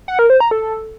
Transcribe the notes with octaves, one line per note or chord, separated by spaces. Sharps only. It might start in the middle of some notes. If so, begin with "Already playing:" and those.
F#5
A#4
C5
A#5
A4